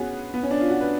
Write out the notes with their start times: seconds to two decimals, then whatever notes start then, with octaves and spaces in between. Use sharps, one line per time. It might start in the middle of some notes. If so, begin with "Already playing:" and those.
Already playing: B3 C#4 F#4 G#4
0.34 B3
0.43 C#4
0.51 D4
0.61 F4
0.69 F#4
0.81 B4